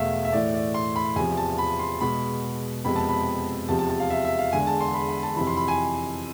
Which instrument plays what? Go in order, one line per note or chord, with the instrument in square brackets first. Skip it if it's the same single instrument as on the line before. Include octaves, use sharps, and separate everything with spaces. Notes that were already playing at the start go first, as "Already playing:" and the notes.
Already playing: [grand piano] E2 B2 A3 E5 F5
E5
A2 E3 A3 D5
D5
C6
B5
E2 C3 F3 G#5
A5
B5
C6
B2 G#3 B3 B5
F2 C3 G#3 B3 B5
A5
B5
E2 C3 F3 A5
A5
A5
F5
E5
E5
F5
E2 D3 G#3 G#5
A5
C6
B5
B5
A5
F2 C3 E3 B5
C6
B5
G#5